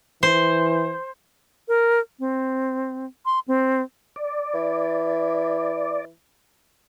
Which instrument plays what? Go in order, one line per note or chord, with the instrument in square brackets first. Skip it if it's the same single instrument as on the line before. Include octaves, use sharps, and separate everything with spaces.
[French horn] E3 [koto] C5
[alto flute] A#4
C4
C6
C4
[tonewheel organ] D5
[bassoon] E3